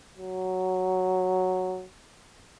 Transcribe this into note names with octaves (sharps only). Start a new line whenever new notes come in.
F#3